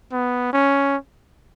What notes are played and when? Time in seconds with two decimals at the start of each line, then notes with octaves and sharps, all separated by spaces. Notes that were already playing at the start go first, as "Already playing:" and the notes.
0.12 B3
0.53 C#4